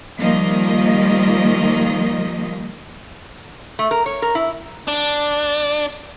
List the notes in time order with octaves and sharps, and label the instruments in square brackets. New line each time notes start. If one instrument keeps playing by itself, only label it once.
[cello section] D#3 F3 G3 A#3 D#5
[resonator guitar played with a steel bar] A3
A#4
C#5
A#4
E4
[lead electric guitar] D4